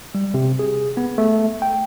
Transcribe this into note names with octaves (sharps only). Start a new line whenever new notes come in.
G3
C3
G#4
B3
A3
G5